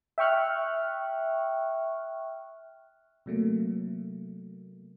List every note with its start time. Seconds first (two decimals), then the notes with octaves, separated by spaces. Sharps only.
0.18 E5 G5 C#6 F6 F#6
3.26 C3 F#3 A3 A#3